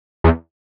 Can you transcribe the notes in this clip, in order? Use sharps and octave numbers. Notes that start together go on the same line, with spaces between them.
E2